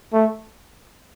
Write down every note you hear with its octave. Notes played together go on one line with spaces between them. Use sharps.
A3